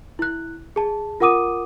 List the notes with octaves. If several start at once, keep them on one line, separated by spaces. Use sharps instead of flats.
E4 F#6
G#4 A5
F4 A#4 F#5 D6 D#6 D#7